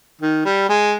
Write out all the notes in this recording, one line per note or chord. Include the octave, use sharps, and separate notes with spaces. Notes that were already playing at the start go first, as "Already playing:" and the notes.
D#3
G3
G#3